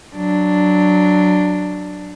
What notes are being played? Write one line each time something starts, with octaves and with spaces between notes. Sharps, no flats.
F#3 D4